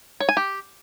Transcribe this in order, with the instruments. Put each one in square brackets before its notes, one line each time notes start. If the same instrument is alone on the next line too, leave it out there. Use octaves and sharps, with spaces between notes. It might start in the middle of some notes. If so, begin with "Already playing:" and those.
[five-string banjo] C#5
G#5
G4